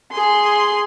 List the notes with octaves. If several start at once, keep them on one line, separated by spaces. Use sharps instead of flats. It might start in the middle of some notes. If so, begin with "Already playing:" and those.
G#4 C6